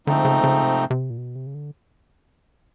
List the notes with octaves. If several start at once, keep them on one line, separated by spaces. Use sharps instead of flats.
G#2 D3 F3 A3 C4 D#4
C#3
C#3
C3
C3
A#2
B2
C3
C#3
D3